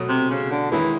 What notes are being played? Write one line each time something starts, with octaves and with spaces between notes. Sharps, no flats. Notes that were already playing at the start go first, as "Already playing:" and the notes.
Already playing: B2 F#3 A3
C3
C#3
D3
D#3 E3 G#3 C#4 E4